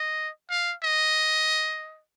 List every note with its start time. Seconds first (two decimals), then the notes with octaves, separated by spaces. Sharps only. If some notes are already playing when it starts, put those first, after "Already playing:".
Already playing: D#5
0.50 F5
0.83 D#5